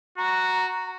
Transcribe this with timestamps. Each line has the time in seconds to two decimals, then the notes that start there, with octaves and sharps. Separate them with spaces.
0.18 F#4 A#5